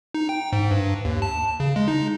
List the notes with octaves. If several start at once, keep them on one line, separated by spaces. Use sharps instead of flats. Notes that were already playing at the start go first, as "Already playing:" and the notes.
D#4
G5
G#2
G2
D#2
A5
C#3
G#3
D#4